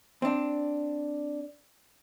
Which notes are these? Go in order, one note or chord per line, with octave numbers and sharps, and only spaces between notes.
C4 D4